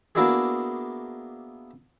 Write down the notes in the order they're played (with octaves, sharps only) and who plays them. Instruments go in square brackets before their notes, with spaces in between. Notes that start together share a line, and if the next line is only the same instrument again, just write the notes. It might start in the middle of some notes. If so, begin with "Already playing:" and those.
[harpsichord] A#3 B3 D4 E4 F#4 G#4